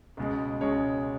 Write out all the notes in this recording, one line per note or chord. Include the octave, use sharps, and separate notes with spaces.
C#2 B2 G#3
C#2 B2 G#3 C#4 C#5